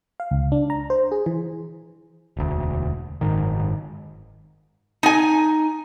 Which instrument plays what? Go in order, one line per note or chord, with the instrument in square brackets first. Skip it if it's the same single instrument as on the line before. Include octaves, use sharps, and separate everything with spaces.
[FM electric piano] F5
C#2
D4
A#5
C5
G#4
E3
[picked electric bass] E1 D2
F#1 G#2 D#3
[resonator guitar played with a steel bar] D#4 G#5